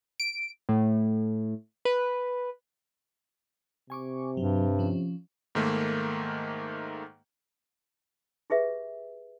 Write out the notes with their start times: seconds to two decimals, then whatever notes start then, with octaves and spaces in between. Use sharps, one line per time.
0.20 D7
0.69 A2
1.85 B4
3.90 C3 G#5 C#6 D6
4.37 G2 F#3
4.79 F3 C#4
5.55 G#2 D#3 A3 A#3
8.50 G4 G#4 B4 E5